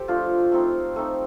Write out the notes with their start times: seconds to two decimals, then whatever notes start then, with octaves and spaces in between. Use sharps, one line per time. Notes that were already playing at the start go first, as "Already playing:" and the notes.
Already playing: G4 A4 C5
0.08 F3 A3 D4 F4
0.52 A3 C4 D#4
0.96 A3 C4 D#4